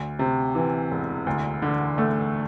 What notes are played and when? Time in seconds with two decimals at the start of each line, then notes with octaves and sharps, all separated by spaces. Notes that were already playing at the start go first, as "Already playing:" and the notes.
Already playing: D2
0.19 C3
0.55 E3
0.91 E1
1.27 D2
1.62 D3
1.98 A3